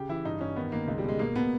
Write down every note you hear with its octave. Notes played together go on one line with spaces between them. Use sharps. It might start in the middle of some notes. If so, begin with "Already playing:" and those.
Already playing: C#3 G4
E3 E4
G2 D#4
G2 C#4
D#3 B3
D#3 A#3
C#2 G#3
G3
B2 G#3
B2 A#3
B2 B3